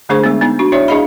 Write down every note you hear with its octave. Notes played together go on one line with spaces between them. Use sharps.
D3 A3 D4 G#4 C5 C#6
G#3 B3
B3 D#4
D4 F#4
E4 C#5 D5 E5
D4 E4 G#4 D#5 F5 B5